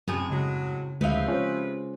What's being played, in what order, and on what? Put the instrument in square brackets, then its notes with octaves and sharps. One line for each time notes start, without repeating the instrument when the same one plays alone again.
[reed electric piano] F#2 [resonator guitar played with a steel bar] A2 C3 G#4
[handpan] C#3 [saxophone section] F#3 G#3
[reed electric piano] D2 E5 [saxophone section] C3 B4 [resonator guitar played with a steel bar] F3 D#4 F5 [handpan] G#3
[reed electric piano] C#4 [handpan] F4 G#4 C5